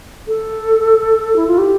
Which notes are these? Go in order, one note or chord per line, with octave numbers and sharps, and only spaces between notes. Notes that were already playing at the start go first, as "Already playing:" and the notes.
A4
E4
F4
G4